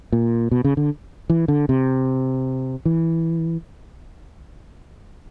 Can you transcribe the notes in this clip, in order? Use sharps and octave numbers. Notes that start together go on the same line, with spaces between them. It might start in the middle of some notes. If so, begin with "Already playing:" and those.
A#2
B2
C#3
D3
E3
D3
C3
E3